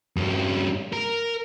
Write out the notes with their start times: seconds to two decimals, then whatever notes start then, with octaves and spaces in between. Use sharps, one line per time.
0.17 G2 C#4
0.93 A#4